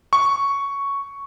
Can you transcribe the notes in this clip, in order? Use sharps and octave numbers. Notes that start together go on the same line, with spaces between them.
C#6